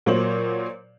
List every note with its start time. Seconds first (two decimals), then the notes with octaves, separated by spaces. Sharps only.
0.06 A#2 F#3 A#3 C5 C#5 F#7